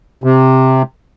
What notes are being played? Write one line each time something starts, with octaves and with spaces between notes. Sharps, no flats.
C3